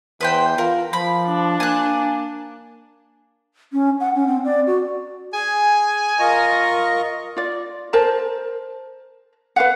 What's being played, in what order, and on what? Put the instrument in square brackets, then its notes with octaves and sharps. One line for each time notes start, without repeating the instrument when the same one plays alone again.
[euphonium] E2 [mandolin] B4 C5 G5
[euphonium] F4 [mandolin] A#4
[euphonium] F3 [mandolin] B5
[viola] D4
[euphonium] A#3 [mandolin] G#5 F#6
[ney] C#4
F#5
C#4
C4
D5
F#4
[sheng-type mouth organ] G#4 [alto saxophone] G#5
[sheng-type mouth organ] F4 D#5 C#6 [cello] A#4
[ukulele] F4 D5
A#4 C5 A5 A#5
B4 F5 F#5